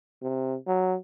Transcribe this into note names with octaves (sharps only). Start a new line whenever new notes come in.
C3
F#3